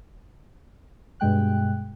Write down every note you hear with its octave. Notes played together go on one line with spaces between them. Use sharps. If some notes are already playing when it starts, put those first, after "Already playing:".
G2 B2 G#3 G5 F#6